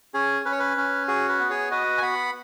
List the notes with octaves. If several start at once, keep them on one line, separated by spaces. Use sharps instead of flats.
C#4 G#4
C#4 B4
C#5
B4
C#4
F#4 G#4
B4
B3
G#4 C#5
F#4 B4 D#5
G#5
B3 F#5 B5